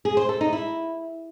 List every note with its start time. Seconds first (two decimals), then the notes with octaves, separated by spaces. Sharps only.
0.05 G#4
0.17 C5
0.29 A4
0.41 D#4
0.53 E4